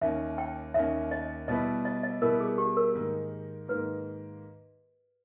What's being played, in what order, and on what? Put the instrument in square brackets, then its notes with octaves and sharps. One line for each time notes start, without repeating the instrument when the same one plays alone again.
[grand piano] D#2 D#3 A#3 C#4 [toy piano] E5
[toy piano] G5
[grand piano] D#2 D#3 A#3 C#4 [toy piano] E5
[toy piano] D#5
[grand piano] B2 G3 B3 E4 [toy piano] D#5
[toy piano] D#5
D#5
[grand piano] B2 G3 B3 E4 [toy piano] A#4
[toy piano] G#4
G4
A#4
[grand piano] G#2 D#3 A#3
[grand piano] G#2 D#3 A#3 [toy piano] B4